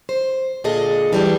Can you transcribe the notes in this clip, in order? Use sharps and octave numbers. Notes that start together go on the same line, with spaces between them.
C5
A#2 D3 G#4 A4 D#5
E3 G3 D4